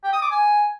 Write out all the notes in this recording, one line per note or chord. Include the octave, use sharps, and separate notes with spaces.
G5
D#6
D6
G#5